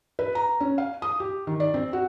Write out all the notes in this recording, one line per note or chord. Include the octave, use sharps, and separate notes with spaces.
B4
A#5
C#4
F5
D#6
G4
D#3
D5
C4
F#4